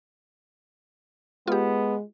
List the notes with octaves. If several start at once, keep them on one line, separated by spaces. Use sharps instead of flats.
G#3 B3 F4 G4